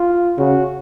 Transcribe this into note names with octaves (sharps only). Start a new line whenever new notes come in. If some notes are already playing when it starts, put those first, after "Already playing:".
Already playing: F4
C#3 F#4